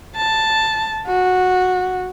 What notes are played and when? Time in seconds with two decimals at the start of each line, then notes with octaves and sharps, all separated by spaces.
0.16 A5
1.06 F#4